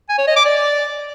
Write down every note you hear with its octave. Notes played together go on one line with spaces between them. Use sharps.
G#5
C#5
D#5
D6
D5